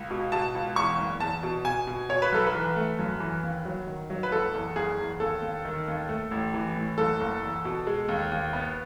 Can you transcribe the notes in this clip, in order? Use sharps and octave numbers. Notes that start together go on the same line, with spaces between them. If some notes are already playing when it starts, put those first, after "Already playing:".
Already playing: C#2
B2
B2 A5
C#2
E2 C#6
F#1
E2 A5
B2
B2 G#5
B2
B2 C#5
B4
B1 A4
B4
E3
A3
F#2
E3
D#2
F#3
D#3
F#3
B4
F#1 A4
E2
F#1 G#4
E2
D#2 A4
D#2
D#3
D#2
A3
A1
E3
A2
F#1 A4
F#1
E2
B2
G#3
D#2
D#2
B3